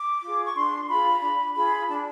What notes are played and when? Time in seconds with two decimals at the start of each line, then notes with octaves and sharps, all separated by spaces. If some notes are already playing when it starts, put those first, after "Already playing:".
Already playing: D6
0.23 F4 G#4
0.45 C#6
0.55 D4 C6
0.89 F4 G#4 B5
1.12 A#5
1.22 D4 B5
1.55 F4 G#4 B5
1.88 D4 A5